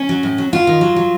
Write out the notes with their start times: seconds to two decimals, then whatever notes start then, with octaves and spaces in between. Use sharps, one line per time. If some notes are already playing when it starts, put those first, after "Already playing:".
Already playing: C#4
0.09 F#3
0.23 A2
0.38 F#3
0.53 F#3 F4
0.67 D#3
0.81 F#3
0.96 F#3